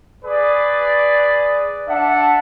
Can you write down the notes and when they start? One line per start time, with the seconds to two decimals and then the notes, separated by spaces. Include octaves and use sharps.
0.25 G#4 B4 D5
1.89 D4 E5 F#5 A5